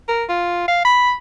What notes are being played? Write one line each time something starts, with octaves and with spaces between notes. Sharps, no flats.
A#4
F4
F5
B5